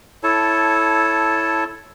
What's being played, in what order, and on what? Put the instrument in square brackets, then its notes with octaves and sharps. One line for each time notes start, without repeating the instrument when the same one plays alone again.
[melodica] E4 A4 C#5 A5